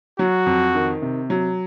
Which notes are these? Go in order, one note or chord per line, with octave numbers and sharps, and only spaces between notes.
F#3 F#4
F2
D#3
C3
F#3